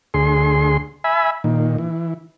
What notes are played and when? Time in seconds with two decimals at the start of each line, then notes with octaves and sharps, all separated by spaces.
0.14 D2 G#4 C6
1.04 E5 G#5 B5
1.44 A#2 D#3
1.78 E3